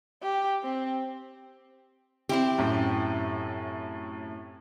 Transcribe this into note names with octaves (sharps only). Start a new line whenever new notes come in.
G4
C4
C4 E4 G4
F#2 A2